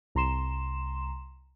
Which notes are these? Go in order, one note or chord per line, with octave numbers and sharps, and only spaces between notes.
C2 A#5 C6 E7